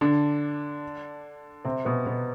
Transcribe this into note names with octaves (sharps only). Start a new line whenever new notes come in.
D3 D4
C3 C4
B2 B3
B2 B3